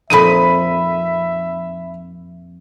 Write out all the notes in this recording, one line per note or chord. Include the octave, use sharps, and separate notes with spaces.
F2 A#2 D#4 E5 B5 D#7